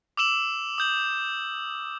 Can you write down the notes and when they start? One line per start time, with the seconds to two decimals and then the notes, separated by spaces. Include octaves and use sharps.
0.17 D6 E6 E7 F#7
0.78 D#6 G6 F#7